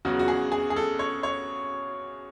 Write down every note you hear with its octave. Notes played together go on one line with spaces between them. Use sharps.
E2 C#3 F#3 F#4
F#4
G#4
G#4
G#4
A4
C#5
C#5